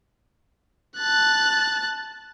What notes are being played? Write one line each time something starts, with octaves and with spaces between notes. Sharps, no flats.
A5 F#6